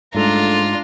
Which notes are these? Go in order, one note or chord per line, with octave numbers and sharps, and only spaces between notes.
G#2 G3 A3 D4 F4 A4 A#5